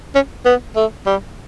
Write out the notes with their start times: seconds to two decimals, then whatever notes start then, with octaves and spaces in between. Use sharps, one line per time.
0.15 C#4
0.45 B3
0.76 A3
1.06 G3